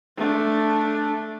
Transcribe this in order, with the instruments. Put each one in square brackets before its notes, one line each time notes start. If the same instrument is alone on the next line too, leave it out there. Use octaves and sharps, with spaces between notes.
[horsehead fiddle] A3 D4